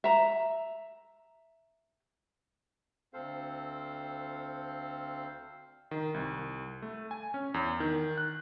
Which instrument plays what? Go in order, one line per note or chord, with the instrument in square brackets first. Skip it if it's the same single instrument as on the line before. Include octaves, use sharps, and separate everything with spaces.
[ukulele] E5 A#5
[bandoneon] D2 C4 A4 C5 F5
[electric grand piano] D#3
C2
A3
G#5
C#4
E2
D#3
F#6